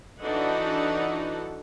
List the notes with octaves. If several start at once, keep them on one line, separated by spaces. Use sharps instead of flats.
E3 D4 D#4 F#4 A4 F#5